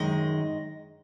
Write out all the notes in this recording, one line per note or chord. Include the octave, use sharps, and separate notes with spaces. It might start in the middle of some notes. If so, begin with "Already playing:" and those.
Already playing: F#2 D#3 G#3 D#5